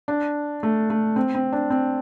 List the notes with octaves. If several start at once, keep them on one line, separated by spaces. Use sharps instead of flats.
D4
A3
A3
C4
C4
D4
C4